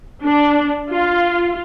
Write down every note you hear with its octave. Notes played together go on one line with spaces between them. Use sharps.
D4
F4